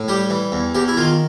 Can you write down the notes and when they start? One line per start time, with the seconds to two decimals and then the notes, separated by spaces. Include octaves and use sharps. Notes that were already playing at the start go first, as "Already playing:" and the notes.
Already playing: A2
0.08 G3 G4
0.30 E3
0.52 E2
0.74 E2 G4
0.88 E4
0.97 D#3 F4